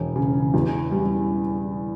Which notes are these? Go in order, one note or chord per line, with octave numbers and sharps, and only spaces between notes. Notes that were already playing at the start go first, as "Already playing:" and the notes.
Already playing: E1
C#3
E2
G3